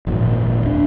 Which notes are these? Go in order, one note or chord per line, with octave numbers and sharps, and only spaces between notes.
G#1 F2 A#2
D#1 D4